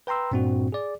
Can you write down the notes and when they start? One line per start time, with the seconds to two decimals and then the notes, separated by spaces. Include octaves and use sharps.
0.07 B4 G5 A#5 C6 E6
0.31 G2 A#2 C4 D4 F#4
0.72 G#4 D5